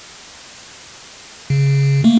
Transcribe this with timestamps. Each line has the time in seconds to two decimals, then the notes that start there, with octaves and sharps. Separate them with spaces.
1.50 C#3
2.04 A3 A#3